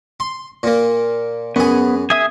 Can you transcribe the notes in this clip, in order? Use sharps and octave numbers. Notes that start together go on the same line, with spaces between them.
C6
A#2 A#3
F#2 B3 G#4
G#4 E5 D#6